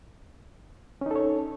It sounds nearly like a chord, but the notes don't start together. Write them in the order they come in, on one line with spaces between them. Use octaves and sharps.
C#4 D#4 A4 C#5